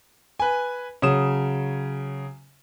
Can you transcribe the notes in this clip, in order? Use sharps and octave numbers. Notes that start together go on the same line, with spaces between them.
B4 G#5
C#3 F#3 D#6 E7